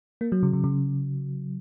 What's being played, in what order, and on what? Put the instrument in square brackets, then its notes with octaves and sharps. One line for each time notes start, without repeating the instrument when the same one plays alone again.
[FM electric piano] A#3
F#3
C#3
C#3
C#3